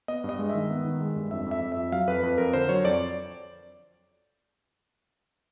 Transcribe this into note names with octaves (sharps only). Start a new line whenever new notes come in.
B3 D#5
G2
D#5
G#3
D#3 E5
B3
D#3
G#3
G2
F2 E5
F2 E5
F2
F2 E5
F#3 F5
F2 B4
F2 B4
F2 A#4
D3 C5
F#3 C#5
F2 D5